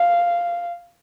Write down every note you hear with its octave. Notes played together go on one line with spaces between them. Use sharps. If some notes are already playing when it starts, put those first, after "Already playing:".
Already playing: F5